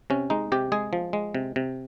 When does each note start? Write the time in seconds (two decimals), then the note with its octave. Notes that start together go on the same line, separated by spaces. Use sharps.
0.10 C3 C#4
0.30 G#3 D#4
0.52 C3 G4
0.72 G#3 G#4
0.93 F3
1.13 G#3
1.35 C3
1.56 C3